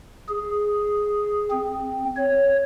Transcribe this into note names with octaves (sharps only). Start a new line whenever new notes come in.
G#4
C4
C#5